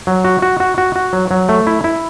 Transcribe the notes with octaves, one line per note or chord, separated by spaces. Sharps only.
F#3
F#4
F#4
F#4
F#4
F#4
F#3
F#3
A3
E4
E4